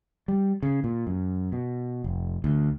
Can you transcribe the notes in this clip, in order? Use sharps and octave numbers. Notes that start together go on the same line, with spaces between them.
G3
C#3
A#2
F#2
B2
F1
D2